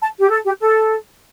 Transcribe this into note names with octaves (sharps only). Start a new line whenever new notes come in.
A5
G4
A4
G4
A4